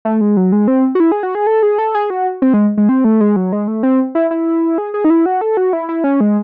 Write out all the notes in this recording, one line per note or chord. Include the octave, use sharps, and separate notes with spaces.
A3
G#3
F#3
G#3
C4
F#4
E4
G#4
F#4
G#4
A4
G#4
A4
G#4
F#4
C4
G#3
G#3
C4
A3
G#3
F#3
G#3
A3
C4
E4
E4
G#4
G#4
D#4
E4
F#4
A4
F#4
E4
E4
C#4
G#3